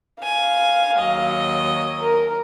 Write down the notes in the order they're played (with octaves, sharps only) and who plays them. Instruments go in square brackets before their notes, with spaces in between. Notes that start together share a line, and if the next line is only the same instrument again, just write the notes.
[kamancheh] F5 [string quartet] G#5
[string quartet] D#2 F#3 D#5
[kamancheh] A#4